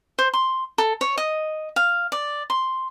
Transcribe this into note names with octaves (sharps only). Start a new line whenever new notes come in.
C5
C6
A4
C#5
D#5
F5
D5
C6